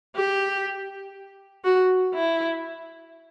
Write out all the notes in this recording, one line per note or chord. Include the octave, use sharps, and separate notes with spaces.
G4
F#4
E4